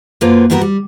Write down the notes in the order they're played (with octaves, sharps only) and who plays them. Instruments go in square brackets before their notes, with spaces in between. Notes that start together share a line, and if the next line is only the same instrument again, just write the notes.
[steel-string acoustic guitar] F#2 D3 A#3 F4 B4 C5
G2 G3 B3 F#4 G#4 A#4
G3